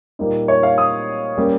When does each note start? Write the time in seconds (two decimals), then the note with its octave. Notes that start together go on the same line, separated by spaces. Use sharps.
0.19 A#2 G3 A#3 D#4
0.48 C#5
0.63 F5
0.78 D#6
1.37 G3 A#3 C#4